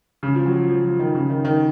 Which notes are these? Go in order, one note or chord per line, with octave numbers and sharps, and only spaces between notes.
C#3
F3
F#3
F3
F3
F3
D#3
C#3
D#3
D#3